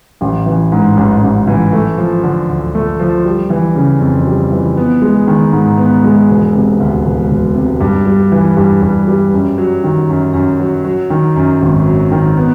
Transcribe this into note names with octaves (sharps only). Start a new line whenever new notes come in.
A1
E3
G#2
A1
A1
E3
A3
F3
D3
D2
A3
F3
G3
E3
C#3
F2
G3
E3
B3
G#3
D#3
G#2
B3
G#3
E1
C3
D2
E1
E1
C3
G2
G3
E3
G2
G2
G3
F#2
F#3
D#3
F#2
F#2
F#3
F#3
D#3
F#2
G#1
F#3
D#3
B3